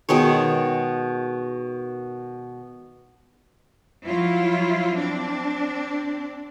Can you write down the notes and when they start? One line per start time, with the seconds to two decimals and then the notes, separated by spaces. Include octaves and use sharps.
0.09 B2 D#3 G#3 C#5
4.06 F3 F#3 E4 F4
4.96 C4 D4